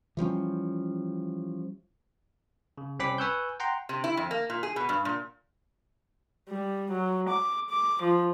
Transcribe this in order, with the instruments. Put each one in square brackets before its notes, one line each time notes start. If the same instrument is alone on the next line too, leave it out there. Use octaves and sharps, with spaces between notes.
[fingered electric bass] E3 F3 G3 C#4
[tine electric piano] C#3
C2 C4 C#4 B5 D6 B6
B4 G#5 C#6 E6 F#6 G6
F#5 G5 A#5 C6
[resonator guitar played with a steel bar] C3
E4
F2
A#3
A#2
G#4
B2
G2
A#2
[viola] G3
F#3
D6
D6
F3